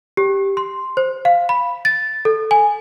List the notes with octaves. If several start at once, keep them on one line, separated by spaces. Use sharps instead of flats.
G4
C6
C5
F5
B5
A6
A4
G#5